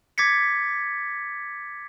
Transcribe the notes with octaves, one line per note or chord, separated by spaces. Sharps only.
D6 G#6 A6 B6 C#7